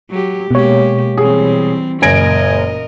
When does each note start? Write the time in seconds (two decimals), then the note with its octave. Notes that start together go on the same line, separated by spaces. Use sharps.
0.10 F#3 G4
0.51 B2 G#3 A#3 G4 C#5
1.17 E3 G3 C4 G#4
2.02 F#1 A#2 A#4 D#5 G#5 G#6 A#6 D7